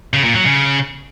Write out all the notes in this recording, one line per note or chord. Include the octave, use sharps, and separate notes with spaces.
C#3
A#2
F#3
C#3